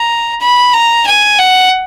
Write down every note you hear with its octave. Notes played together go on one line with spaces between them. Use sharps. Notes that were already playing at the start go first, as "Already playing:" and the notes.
Already playing: A#5
B5
A#5
G#5
F#5